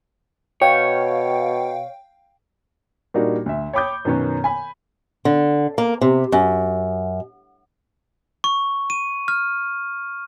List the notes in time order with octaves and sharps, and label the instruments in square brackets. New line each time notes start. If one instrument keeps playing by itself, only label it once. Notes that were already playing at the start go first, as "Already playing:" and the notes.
[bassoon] B2 [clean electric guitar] C#5 [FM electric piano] F5 G5
[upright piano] A#2 G3 A#3 D4 D#4 F#4
D2 E5
C#5 G5 B5 D6 D#6 G6
F#2 B2 D#3 B3 C#4
G#5 B5
[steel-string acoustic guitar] D3
A#3
C3
F#2
[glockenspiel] C#6
D#7
F6